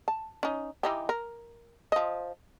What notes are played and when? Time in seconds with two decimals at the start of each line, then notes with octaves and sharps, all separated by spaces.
0.08 A5
0.43 C#4 D#4
0.83 E3 D#4 G4
1.09 A#4
1.92 F3 D#5